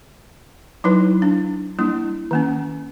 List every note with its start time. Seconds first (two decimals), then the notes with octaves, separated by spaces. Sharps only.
0.84 F#3 D#4 E4 B4
1.22 D4
1.79 G3 A#3 D4 E4
2.31 D#3 A#3 C#4